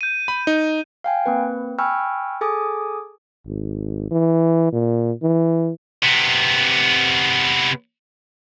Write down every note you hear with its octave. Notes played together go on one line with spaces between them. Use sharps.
G6 D#7
B5
D#4
F5 G5 G#5
A#3 C4 B4
G5 G#5 B5 C#6 E6 F6
G#4 A4 G#5 D6 D#6
G#1
E3
A#2
E3
C3 B3